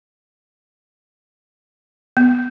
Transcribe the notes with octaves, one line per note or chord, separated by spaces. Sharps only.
B3